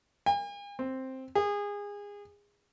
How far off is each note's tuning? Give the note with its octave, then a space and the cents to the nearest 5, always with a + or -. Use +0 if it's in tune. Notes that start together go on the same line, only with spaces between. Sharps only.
G#5 -45
C4 +5
G#4 -25